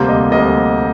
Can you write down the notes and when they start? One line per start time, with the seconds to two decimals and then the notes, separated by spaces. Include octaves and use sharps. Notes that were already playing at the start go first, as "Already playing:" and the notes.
Already playing: D2 C3 G3 A#3 C5
0.09 D#5
0.32 D2 C3 G3 A#3 D#5